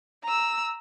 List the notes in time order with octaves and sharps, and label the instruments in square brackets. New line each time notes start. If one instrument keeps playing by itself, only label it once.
[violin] A#5 E6